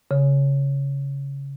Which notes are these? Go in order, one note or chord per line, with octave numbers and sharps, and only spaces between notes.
C#3